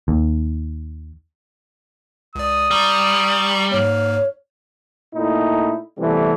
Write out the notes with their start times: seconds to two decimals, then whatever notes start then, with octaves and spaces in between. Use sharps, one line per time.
0.08 D#2
2.35 C#2 D5 D#6
2.71 G3 D5 A#5 C#6
3.71 G#2 A#3 C#5 F6
5.14 A#2 A3 D#4 E4
5.97 C3 E3 G3 A3 B3